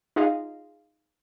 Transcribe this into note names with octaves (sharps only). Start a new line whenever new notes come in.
D#4 F4 G#4 D#5 F5